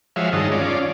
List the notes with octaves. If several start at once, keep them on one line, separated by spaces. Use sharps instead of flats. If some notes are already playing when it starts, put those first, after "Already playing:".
F3 G#3 F#4 C#5 E5 F5
G2 D#3 G#3 D#5 A5
C#4 F4 D5